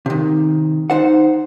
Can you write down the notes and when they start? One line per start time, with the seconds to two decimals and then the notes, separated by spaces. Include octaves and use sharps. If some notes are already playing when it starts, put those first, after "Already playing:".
0.06 C3 D#3
0.90 D#4 C5 F#5